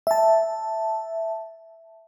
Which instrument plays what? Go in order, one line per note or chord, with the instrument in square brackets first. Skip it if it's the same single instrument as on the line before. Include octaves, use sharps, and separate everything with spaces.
[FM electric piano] E5 A5